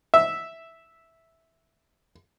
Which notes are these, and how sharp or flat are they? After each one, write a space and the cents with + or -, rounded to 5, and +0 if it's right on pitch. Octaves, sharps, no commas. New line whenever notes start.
E5 -5